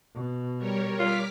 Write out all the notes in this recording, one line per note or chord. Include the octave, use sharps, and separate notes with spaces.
B2
G3 A#4 C#5
F4 D6 F6 B6